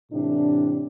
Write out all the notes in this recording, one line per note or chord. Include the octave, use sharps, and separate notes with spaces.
A2 C3 E3 D4